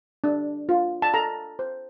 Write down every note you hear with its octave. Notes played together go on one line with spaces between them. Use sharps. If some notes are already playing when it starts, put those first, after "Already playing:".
D4
F4
A5
A4 A#5
C5